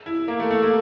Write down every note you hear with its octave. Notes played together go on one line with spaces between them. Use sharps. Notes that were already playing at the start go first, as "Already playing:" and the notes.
E4
A#3
A3
A3
A#3